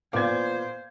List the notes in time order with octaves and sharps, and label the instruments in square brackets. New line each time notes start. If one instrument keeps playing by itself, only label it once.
[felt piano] A#2 B3 D6 [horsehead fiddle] C5 [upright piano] F5 G#6